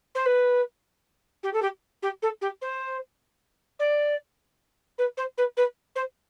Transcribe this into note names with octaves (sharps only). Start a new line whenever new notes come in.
C5
B4
G4
A4
G4
G4
A4
G4
C5
D5
B4
C5
B4
B4
C5